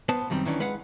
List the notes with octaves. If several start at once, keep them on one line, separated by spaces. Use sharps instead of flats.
B3 B4 C5 A5
F#2 D#3 G3 C4
D#3 E3 C#4 D4
G#3 B4 F5 F#5